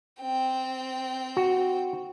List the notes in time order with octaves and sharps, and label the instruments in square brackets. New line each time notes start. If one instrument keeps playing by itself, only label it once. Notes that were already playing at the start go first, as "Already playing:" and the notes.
[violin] C4 G5
[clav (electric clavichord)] F#4